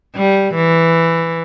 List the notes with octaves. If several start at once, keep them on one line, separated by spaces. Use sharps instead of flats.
G3
E3